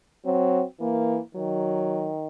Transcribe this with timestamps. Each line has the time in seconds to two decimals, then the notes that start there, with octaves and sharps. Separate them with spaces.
0.26 F#3 C4
0.80 E3 A#3
1.35 D#3 F#3